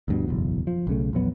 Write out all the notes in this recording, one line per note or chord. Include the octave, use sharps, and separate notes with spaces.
D2 G2 B2
F#1 B1 E2
F3
B1 C#3 A3
A#1 E2 F#3 B3